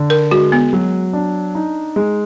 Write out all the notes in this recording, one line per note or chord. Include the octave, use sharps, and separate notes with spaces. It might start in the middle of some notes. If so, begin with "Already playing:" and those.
Already playing: D3
A#4
G#3 F#4
B3
F#3
D4
D#4
G#3